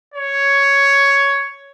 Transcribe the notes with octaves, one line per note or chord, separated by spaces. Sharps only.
C#5